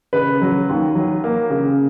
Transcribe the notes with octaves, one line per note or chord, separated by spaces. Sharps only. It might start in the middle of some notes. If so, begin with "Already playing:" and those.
C#3 B4
F#3
D#2
F#3
A#3
C#3